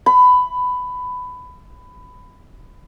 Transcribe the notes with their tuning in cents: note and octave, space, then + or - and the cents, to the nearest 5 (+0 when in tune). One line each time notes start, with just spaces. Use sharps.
B5 +15